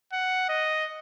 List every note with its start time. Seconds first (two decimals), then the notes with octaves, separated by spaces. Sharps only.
0.13 F#5
0.49 D#5